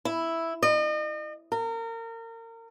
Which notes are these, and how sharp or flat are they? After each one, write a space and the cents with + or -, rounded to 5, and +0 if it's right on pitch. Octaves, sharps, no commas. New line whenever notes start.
E4 +0
D#5 -40
A#4 -30